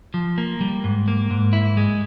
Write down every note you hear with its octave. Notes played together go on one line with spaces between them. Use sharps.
F3
A#3
G3
G#2
A#3
G#2
E4
G#3